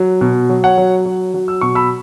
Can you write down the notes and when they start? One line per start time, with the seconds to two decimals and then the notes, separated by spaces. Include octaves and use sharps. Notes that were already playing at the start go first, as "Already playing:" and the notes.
Already playing: F#3
0.21 B2
0.49 F#3
0.64 C#5 F#5
0.78 F#3
1.06 F#3
1.34 F#3
1.48 E6
1.61 B2 C#6
1.75 B5 E6